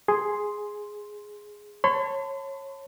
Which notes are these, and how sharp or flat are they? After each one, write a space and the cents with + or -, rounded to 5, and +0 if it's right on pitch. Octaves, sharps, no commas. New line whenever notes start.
G#4 +0 C6 +0
C#5 -20 A5 +20 C6 -45